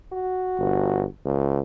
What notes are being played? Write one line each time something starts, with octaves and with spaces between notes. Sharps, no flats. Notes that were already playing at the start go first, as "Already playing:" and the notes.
F#4
G1
C#2